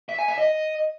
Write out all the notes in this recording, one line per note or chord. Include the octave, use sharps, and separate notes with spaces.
E5
G#5
E5
D#5